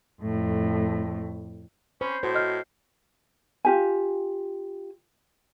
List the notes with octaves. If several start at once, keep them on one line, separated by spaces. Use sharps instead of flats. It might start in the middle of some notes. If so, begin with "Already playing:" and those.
F2 A2
C#4 C5 B5
A2 F#4 C5
D#5 F6
F4 G4 G#5